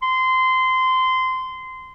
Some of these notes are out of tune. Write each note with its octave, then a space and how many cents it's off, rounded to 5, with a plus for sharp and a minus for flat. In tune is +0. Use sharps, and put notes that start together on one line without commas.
C6 -20